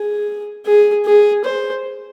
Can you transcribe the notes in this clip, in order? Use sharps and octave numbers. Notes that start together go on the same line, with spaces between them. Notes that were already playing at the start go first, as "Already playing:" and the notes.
Already playing: G#4
G#4
G#4
C5